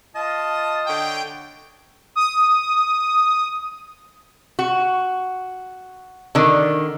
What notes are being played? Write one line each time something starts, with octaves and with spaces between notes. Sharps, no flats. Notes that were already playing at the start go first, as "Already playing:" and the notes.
F4 D#5 A5
D3 C#5 G5
D#6
F#4
D3 D#3